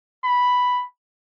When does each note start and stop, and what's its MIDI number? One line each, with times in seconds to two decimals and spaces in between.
0.24 0.83 83